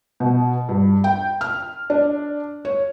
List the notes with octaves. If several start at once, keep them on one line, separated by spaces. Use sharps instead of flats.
B2
G2
G5
F6
D4
C#5